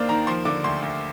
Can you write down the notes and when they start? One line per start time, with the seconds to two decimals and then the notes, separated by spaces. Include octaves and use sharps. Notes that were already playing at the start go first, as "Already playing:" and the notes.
Already playing: D#2 A#3 D4 C5 D5 F5
0.09 D#3 A#5
0.27 F3 C6
0.45 D3 D6
0.64 D2 C6
0.82 D2